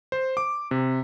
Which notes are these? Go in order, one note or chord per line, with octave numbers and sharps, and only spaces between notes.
C5
D6
C3